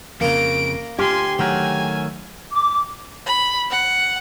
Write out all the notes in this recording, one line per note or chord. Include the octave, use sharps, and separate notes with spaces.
F2 C#3 A#3 D#5 A#5 D7
D2 F4 G4 G#5 C6
D#3 F#3 A3 A#4 G#5
D6
B5
F#5